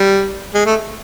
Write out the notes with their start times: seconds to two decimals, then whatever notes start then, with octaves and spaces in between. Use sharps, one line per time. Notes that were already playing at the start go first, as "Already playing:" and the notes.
Already playing: G3
0.54 G#3
0.66 A3